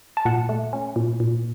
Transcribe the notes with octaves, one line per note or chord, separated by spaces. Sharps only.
A5
A#2 F#5
A3
C#4
A#2
A#2